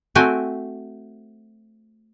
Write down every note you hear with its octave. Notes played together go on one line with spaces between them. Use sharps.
A3 C4 F#4 G5 G#5